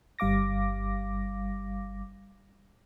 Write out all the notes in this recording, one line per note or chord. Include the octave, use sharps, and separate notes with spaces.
G1 G3 F5 D6 A#6